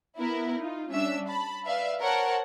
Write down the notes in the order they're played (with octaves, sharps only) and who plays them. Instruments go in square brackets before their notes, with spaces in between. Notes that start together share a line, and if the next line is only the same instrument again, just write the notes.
[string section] B3 E4 A#4
D#4 F4
G3 C#4 D4 E5 E6
A5 B5
B4 D5 E5 F5
A#4 C5 C#5 F#5 A5